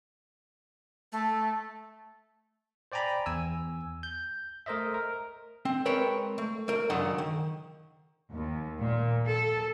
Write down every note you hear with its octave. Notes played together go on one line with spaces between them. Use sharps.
A3
C5 D5 G5 G#5 A#5 B5
E2 G#5 E6
G6
A3 A#4 C5 D#5 E5
A#4
C4
G#3 C4 A#4 B4 C#5
A3
A3 A#4
C#2 F#2 D#3 D4 F#5
D#3
D#2
A#2
A4